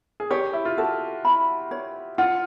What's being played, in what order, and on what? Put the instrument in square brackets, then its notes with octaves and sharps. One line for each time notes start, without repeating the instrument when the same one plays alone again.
[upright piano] G#4
[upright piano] G4 [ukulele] C#5
[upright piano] E4
F4
[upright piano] F#4 [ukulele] A4
[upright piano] E4 [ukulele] B5
[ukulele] C#5
[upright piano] F4 [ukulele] F#5